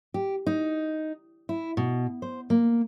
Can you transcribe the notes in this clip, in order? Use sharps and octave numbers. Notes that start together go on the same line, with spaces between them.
G4
D#4
E4
B2
C5
A#3